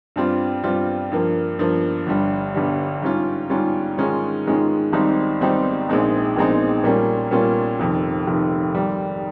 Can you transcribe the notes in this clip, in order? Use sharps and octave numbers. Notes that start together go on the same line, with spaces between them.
G2 G3 C4 F4
G2 G3 C4 F4
G2 F3 A#3
G2 F3 A#3
G1 G2 G3
G1 G2 G3
G#2 G3 C#4 F4
G#2 G3 C#4 F4
G#2 D#3 G#3 C#4 F4
G#2 D#3 G#3 C#4 F4
G#1 G#2 G3 C4 D#4
G#1 G#2 G3 C4 D#4
A#1 A#2 G#3 C4 D#4
A#1 A#2 G#3 C4 D#4
A#2 G3 A#3 C#4 F4
A#2 G3 A#3 C#4 F4
F1 F2 D#3
F1 F2 D#3
G#2 D#3 G3